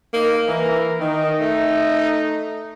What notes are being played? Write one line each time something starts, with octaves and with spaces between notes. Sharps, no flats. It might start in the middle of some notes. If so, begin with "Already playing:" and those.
A#3 D#4
E3 A#4
D#3 D#4
A3